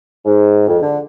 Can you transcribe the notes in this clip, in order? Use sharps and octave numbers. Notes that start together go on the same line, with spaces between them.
G#2
F2
D3